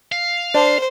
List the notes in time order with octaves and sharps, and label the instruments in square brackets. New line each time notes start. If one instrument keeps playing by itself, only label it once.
[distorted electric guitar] F5
[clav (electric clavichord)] D4 [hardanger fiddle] C5